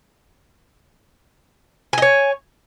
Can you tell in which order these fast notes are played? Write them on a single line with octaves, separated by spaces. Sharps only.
G#5 D#5 C#5